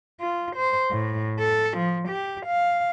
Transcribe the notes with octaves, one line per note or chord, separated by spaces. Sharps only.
F4
C5
A2
A4
F3
G4
F5